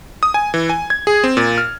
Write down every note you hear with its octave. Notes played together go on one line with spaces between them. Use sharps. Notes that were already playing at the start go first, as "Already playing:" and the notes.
D#6
G#5
E3
G#5
G#6
G#4
C4
A#2
F6